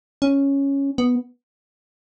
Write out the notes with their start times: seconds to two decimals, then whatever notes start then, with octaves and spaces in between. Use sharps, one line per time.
0.22 C#4
0.98 B3